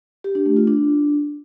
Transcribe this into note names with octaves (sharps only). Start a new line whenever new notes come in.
G4
D4
A3
F4
D4